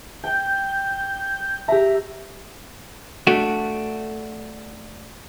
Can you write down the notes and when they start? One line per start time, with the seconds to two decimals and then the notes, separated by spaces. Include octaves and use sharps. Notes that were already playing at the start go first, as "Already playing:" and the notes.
0.24 G5 G6
1.68 G4 E5 A#5
3.27 A3 D4 F#4